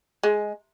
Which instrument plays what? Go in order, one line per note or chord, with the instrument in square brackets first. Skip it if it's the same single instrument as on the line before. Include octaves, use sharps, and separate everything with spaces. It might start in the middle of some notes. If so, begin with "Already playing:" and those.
[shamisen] G#3